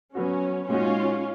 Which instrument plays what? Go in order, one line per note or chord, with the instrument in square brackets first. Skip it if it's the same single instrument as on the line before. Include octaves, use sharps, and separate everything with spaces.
[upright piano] F#3 B3 F#4 [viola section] C#4
[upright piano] A#2 G#3 D#4 F#4 [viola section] C#4 F4